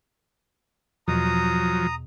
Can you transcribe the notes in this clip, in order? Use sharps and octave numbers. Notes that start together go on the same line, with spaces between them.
E2 B2 F3 F#3 A#5 D#6